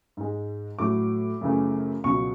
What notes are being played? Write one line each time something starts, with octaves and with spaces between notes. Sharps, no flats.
G#2 G#3
A2 F#3 A3 D6
F#2 C#3 E3 A3
C#2 B2 F#3 C#6